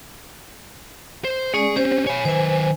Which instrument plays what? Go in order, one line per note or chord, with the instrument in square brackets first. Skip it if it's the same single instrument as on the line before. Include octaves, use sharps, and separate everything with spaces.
[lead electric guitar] C5
[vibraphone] G#3 C#4 D5 [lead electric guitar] G#4
[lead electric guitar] C4 C#4 [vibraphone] G4 C5
[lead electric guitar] C#5 B5 [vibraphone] G#5
[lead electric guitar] D#3 B4 [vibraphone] C5 G#5